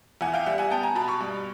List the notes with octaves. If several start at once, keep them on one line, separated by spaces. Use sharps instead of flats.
E2 F#5 G#5
F5 G5
G3 E5 F#5
F#5 G#5
B3 G5 A5
G#5 A#5
B2 A5 B5
B5 C#6
G2